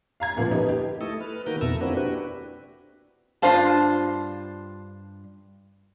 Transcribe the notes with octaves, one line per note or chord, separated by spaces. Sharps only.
F5 A#5 G#6
D2 A#2 F3 B3
B3 D#4 G4
G4
A3 E4 A4 D#5
B4 F6
D#3 A#3 F#4 A#4 B4 G6
F2 B2 A4 E5 A#5 E6
A#3 C4 D4 E4 F#4 B4
D4 F#4 G4 B4
G2 D4 F4 C5 F5 A5